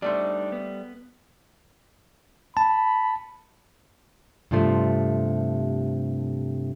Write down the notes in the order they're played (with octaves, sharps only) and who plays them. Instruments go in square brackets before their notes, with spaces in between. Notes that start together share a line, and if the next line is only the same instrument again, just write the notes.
[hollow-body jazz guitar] G3 A3 C5 [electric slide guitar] D4 D#4
[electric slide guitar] B3
[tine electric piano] A5 [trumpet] B5
[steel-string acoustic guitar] G2 C3 F3 A3